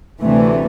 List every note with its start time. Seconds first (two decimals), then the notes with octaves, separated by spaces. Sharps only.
0.22 D2 C3 E3 A3